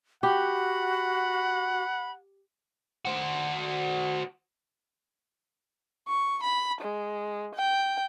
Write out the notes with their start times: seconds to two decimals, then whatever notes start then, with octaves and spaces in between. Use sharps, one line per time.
0.23 F#4 G4 F#5 B5
3.05 F#4 C5
6.08 C#6
6.43 B5
6.81 G#3
7.55 G5